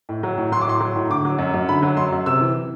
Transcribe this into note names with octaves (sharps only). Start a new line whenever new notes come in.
A2
F#3
A2
F#3 C6
D6
A2 C6
F#3
A2
D3 D6
F#3
F#2
F#2
D3 B5
F#3
F#2 C6
F#2
C3 E6
E3